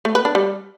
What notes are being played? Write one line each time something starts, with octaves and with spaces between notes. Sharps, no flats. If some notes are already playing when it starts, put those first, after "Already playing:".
A3
B4
D4
G3